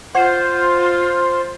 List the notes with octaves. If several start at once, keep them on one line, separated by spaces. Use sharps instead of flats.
F4 C5 F#5